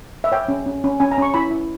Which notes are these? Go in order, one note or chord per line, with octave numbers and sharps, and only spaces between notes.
E5
C#5 G5
C#4
C#4
C#4
C#4 G#5
A#5
C#4 C#6
E4 B5
E4